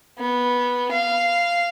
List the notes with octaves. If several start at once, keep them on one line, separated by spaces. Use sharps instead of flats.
B3
F5